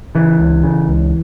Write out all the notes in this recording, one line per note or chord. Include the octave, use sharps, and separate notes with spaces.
C#3 E3
C#2
C#3
C#2